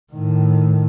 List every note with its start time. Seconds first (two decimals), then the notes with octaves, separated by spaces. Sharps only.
0.13 A2 D#3